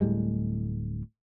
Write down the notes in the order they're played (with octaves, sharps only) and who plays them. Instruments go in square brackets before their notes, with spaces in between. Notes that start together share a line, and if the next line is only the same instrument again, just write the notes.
[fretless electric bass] D1 A2 G3 G#3